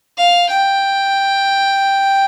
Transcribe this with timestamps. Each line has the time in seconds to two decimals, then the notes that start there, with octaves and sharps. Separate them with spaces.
0.18 F5
0.49 G5